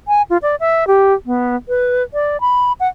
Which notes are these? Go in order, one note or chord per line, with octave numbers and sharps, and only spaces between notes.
G#5
F4
D5
E5
G4
B3
B4
D5
B5
F#5